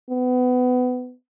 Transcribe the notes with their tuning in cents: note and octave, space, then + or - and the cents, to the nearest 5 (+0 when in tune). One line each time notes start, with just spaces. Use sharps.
B3 +25